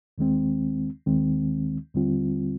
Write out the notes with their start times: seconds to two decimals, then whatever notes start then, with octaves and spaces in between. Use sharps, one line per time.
0.18 D#2 D#3 G#3 C4
1.06 D#2 D#3 G#3 C4
1.94 D#2 D3 G3 C4 F4